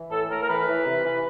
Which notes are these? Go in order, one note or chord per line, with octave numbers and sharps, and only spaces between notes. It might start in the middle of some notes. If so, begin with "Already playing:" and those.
Already playing: E3
A2 A4
A2 A#4
A#4
E3 B4
E3
C3
E3